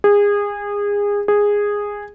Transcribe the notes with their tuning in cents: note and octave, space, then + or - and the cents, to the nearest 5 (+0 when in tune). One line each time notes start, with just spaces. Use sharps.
G#4 -25
G#4 -10